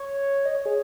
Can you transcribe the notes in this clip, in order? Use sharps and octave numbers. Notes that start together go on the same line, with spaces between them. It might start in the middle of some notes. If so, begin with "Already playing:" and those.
Already playing: C#5
D#5
C#5
G#4